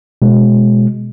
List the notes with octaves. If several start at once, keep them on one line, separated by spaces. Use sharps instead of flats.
B2 G#3